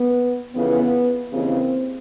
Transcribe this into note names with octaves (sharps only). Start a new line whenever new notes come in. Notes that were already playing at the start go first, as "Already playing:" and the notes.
Already playing: B3
F2 C#3 E3 B3
D#2 C#3 E3 C4